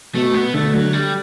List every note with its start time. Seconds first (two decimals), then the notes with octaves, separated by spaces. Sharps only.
0.15 B2 A3
0.34 B3
0.54 D3 A3
0.73 F#3
0.93 G3